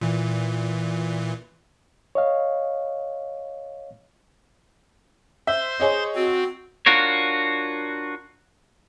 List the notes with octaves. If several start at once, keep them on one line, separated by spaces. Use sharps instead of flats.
A#2 E3
C#5 D#5 F5
C5 E5 C6
G#4 C#5 D#5
C4 F#4
D4 F4 F#4 A#4 C#5